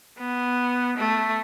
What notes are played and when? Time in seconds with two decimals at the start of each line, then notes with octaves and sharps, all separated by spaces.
0.18 B3
0.97 A3